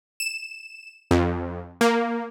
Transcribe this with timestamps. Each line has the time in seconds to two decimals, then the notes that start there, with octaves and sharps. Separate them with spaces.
0.20 E7
1.11 F2
1.81 A#3